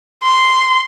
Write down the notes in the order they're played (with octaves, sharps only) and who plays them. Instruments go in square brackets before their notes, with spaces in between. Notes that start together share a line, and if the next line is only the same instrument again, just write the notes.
[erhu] C6